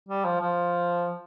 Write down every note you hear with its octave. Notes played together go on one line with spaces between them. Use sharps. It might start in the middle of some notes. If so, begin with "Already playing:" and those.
G3
F3
F3